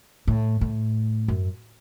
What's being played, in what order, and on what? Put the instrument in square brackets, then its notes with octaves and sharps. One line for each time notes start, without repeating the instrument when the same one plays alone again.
[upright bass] A2
A2
F#2